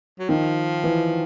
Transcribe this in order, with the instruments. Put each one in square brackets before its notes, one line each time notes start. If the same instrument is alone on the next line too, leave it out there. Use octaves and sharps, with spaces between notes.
[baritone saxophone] F#3
[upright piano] D#3 [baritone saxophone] F3
[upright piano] E3